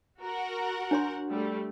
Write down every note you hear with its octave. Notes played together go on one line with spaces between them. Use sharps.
F#4 A#4 F#5
D4 C#5 C6
G3 A3